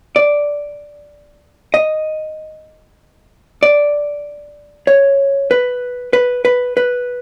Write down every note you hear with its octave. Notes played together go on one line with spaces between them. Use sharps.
D5
D#5
D5
C#5
B4
B4
B4
B4